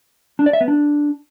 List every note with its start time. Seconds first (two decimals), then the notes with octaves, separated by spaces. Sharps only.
0.39 D4
0.46 D5
0.53 E5
0.61 B3
0.68 D4